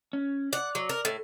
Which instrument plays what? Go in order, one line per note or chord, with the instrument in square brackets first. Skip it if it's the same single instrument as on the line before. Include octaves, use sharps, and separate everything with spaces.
[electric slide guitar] C#4
[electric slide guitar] D5 [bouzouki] F#5
[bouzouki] F#3
A#4
A2